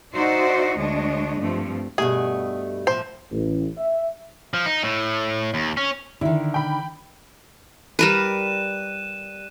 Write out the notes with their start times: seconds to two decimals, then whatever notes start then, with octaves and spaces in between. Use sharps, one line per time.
0.14 D#4 F#4 C5 D5 E5
0.77 D2 G#3 D4 C#5 D#5
1.40 G2 F3 A3 C4
1.98 G2 B2 A3 G4 G#4
2.87 A2 F3 C5
3.31 A1
3.78 E5
4.54 F3
4.66 D#4
4.83 A2
5.54 D#2
5.77 C#4
6.21 D3 D#3 E4
6.54 G5 B5
7.99 G3 A#4 B4 F#6 D#7 E7